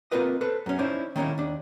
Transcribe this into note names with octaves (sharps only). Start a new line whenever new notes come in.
A#3 C4 F4 A#4 B4 D#5
A4 B4 C5
F#2 C#4
C#4 D#4 E4 C5 D5
D#3 A#3 C#4 D#4 E4
D#2 D4